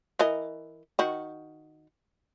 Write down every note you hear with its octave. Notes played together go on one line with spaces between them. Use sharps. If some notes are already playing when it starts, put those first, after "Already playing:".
E3 A#4 D#5
D#3 F#4